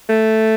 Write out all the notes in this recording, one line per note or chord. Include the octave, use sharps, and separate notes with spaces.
A3